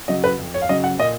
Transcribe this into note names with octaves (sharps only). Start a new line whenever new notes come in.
C#3 F#3 D#5
B4
F2
C#5
F5
C#3 F#3 D#5
F#5
A#2 D#5